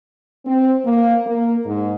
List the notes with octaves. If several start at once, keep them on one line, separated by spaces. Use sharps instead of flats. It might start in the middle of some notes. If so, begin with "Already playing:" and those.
C4
A#3
A#3
G#2